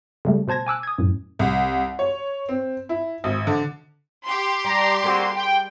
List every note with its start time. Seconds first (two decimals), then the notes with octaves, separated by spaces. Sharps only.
0.25 C#3 G3 A3
0.48 B2 C5 A5 G#6 A#6
0.67 G#5 D6 E6 F#6
0.83 D#6 G#6
0.98 F#2 A2
1.39 C2
1.99 C#5
2.49 C4
2.89 E4
3.24 G#1
3.47 D3
4.26 G4 C6
4.64 G3 A5 A#5
5.04 G3 A#3 C4 F#4 G#4 A#4
5.36 G5